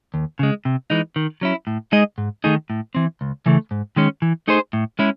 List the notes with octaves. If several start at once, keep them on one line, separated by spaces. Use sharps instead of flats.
D#2
C#3 G#3
C3
E3 G#3 D#4
D#3
F#3 C#4 E4
A2
G#3 D#4 G#4 D#5
G#2
D#3 A3 D#4 G#4
A2
E3 C4
C#2
C#3 E3 A3
G#2
D#3 G#3 C#4
E3
A3 D#4 G#4 C5
A2
G#3 C#4 E4 G#4